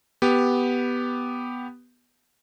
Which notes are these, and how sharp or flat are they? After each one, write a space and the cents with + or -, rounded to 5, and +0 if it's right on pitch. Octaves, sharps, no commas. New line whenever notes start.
B3 +0 G4 +0